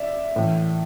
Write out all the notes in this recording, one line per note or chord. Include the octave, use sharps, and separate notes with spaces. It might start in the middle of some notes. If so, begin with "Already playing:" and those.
Already playing: D5 E5
A2 E3